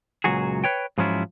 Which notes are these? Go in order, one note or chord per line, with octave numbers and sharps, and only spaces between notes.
C#2 A#2 F#3 F#4 G#4
B4 C#5 G5
G#2 F3 F#3 C#4 E4 F4